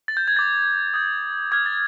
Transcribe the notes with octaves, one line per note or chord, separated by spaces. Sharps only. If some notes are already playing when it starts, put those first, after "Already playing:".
A6
G6
G#6
D6 G6 A6
D#6 G6
D6 F6 G#6
A6